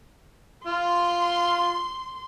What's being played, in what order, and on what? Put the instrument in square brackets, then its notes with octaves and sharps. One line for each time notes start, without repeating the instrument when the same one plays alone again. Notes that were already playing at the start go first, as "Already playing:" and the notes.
[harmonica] F4 [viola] C6